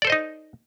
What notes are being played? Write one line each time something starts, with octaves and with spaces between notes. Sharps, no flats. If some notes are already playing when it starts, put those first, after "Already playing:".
D#4 A4 C5 D5 D#5